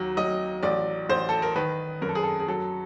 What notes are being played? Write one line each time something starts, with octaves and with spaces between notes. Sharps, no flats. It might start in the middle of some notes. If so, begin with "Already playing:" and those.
Already playing: D#2 F#3
F#3 D#5
A1 D5
A1 C5
A4
A#4
D#3 B4
F#2 A#4
A4
G#4
A4
G#4
F#3 A4